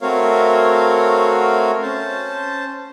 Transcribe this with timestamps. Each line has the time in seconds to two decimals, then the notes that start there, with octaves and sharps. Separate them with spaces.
0.01 A3 C4 F#4 A#4 C#5 F5
1.82 C#4 C5 A5